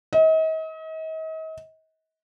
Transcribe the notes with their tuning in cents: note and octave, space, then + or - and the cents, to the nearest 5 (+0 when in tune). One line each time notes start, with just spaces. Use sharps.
D#5 +40